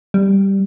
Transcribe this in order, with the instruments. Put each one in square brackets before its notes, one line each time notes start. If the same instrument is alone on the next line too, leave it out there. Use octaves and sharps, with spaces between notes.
[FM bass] G3